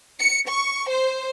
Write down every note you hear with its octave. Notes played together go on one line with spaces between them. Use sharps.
C#7
C#6
C5